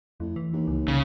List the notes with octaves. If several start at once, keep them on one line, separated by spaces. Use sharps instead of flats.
F2 A2
E3
D#2
C#2
C2 C#3